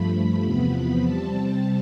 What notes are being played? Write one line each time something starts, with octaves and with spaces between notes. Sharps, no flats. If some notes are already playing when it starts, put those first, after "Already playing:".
Already playing: G2 F3 A3 B5
E2 C3 F3 B3 B5
C3 G3 C4 A5